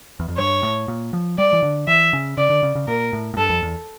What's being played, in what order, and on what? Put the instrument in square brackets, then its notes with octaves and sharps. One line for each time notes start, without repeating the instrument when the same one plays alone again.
[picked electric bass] E2
F2
[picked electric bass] G2 [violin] C#5
[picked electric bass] A2
A#2
F3
[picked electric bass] G3 [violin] D5
[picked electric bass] E3
D3
[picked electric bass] E3 [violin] E5
[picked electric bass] C#3
[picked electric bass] C#3 [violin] D5
[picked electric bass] D3
C#3
C#3
[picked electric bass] A#2 [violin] A#4
[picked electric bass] A2
A2
[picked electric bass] G2 [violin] A4
[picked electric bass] F2
E2